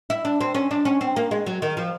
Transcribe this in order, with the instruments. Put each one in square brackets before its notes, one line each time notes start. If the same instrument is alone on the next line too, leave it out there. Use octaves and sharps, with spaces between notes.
[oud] E4
D4
C4
C#4
D4
C#4
C4
A#3
G#3
F#3
D#3
F3